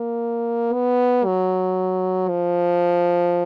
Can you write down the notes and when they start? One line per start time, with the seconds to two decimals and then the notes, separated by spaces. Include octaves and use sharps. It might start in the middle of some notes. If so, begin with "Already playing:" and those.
Already playing: A#3
0.74 B3
1.26 F#3
2.29 F3